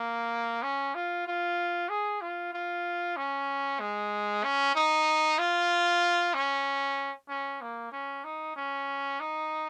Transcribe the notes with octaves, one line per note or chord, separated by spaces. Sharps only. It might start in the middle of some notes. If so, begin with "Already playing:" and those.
Already playing: A#3
C#4
F4
F4
G#4
F4
F4
C#4
G#3
C#4
D#4
F4
C#4
C#4
A#3
C#4
D#4
C#4
D#4